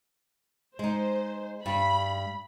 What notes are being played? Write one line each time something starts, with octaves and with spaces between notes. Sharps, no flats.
G#3 D#4 C5
G2 G3 B5